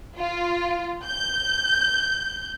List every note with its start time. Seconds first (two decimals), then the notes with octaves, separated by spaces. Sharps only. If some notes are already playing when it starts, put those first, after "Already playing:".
0.18 F4
1.05 G6